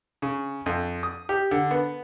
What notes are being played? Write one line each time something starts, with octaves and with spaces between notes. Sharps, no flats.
C#3
F2
D#6
G4
D3
B3